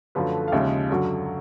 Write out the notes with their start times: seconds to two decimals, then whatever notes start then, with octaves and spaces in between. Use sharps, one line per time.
0.15 F#2 D3 F3 A3 B4
0.48 F5
0.52 D#2 C#3 F3 G#3 E5
0.90 F#2 D3 F#3